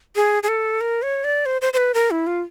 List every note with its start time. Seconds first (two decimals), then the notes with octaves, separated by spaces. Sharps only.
0.16 G#4
0.43 G#4
0.48 A4
0.81 A#4
1.02 C#5
1.24 D5
1.46 C5
1.62 C5
1.73 C5
1.77 B4
1.94 A#4
2.11 E4
2.27 F4